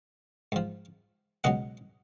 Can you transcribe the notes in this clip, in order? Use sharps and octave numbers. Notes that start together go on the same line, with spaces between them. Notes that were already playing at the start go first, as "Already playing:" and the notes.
G#2 F3
C#2 B2 F#3 D#5 F#5